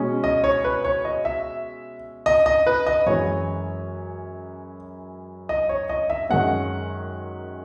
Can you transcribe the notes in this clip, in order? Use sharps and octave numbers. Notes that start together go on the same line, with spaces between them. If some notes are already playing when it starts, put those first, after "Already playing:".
Already playing: B2 G#3 C#4
D#5
C#5
B4
C#5
D#5
E5
D#5
D#5
B4
D#5
F#2 E3 G#3 C#5
D#5
C#5
D#5
E5
F#2 D#3 G#3 C#4 F#5